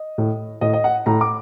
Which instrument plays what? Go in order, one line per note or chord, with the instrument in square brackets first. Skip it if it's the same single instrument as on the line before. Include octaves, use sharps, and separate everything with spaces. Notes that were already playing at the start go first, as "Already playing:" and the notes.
Already playing: [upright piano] D#5
A2
A2 D#5
D#5
F#5
A2 A#5
D6